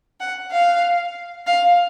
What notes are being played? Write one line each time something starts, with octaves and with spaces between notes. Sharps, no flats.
F#5
F5
F5